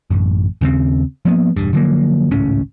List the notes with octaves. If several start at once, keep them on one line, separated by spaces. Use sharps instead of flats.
A1 F#2
D#2 C#3 A#3 C4
F3 A#3 B3
E1 G2
D3 F3 F#3 A#3
G#1 C#2 A2 C#4